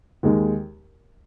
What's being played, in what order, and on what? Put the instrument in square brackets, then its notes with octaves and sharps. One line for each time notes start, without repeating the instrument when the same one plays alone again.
[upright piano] D#2 D#3 G#3